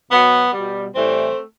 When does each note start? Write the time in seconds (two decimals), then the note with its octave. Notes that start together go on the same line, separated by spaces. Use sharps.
0.10 B2 F#3 B3
0.53 B2 G3
0.94 A2 E3 G3 A3 C4